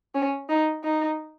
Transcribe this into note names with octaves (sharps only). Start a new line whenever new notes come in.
C#4
D#4
D#4